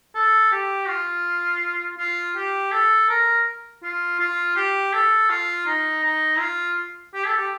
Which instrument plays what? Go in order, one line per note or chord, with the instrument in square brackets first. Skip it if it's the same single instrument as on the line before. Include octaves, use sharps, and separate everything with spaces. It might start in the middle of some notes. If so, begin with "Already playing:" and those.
[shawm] A4
G4
F4
F4
G4
A4
A#4
F4
F4
G4
A4
F4
D#4
D#4
F4
G4
A4
G4